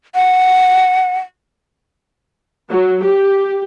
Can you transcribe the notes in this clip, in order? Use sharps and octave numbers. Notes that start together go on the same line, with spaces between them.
F#5
F#3
G4